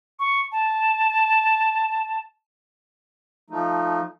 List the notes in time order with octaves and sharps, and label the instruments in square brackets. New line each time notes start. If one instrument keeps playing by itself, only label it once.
[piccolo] C#6
A5
[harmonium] F3 A3 D#4